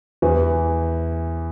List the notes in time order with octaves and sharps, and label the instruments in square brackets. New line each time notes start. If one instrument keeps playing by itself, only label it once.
[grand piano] E2 E3